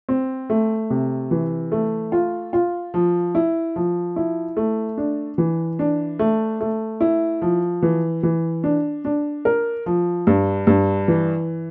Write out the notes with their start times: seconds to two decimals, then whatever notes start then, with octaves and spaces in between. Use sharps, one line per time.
0.09 C4
0.50 A3
0.90 C3
1.31 E3
1.72 A3
2.12 F4
2.53 F4
2.94 F3
3.35 E4
3.76 F3
4.16 E4
4.57 A3
4.98 D4
5.38 E3
5.79 D4
6.19 A3
6.60 A3
7.01 E4
7.42 F3
7.82 E3
8.23 E3
8.64 D4
9.05 D4
9.45 A#4
9.86 F3
10.27 G2
10.67 G2
11.08 E3